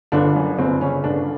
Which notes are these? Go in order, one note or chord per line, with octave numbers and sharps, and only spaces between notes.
G1 D3 D4
F#2
G1 C4
C#3 C#4
G1 D3 D4